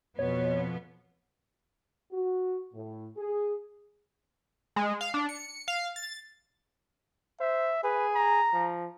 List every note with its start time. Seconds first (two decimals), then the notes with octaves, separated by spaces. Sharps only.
0.19 F2 B2 B3 C#5
2.12 F#4
2.73 A2
3.16 G#4
4.76 G#3
5.01 F5
5.14 D4
5.29 C#7
5.68 F5
5.96 A6
7.40 C5 E5
7.84 G#4 B4
8.15 A#5
8.53 F3